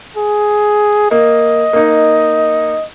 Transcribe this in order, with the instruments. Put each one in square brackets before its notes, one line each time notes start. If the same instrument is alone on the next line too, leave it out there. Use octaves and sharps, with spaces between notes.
[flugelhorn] G#4
[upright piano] A#3 [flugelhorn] D#5
[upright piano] A#3 D#4